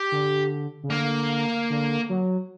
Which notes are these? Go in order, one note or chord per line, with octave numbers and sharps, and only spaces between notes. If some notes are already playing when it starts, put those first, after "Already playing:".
Already playing: G4
D3
C#3
D3 A#3
D3
F#3